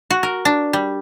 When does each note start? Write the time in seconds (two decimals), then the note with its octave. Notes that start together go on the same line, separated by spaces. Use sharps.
0.10 F#4
0.23 A#4
0.45 D4
0.73 G3